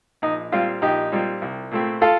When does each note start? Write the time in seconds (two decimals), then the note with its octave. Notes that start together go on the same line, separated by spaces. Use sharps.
0.22 A#1 D#4
0.52 A#2 G3 C4 F4
0.82 A#1 D#4 G4
1.12 A#2 G3 C4
1.42 C2
1.71 A#2 A3 C4
2.02 F4 A4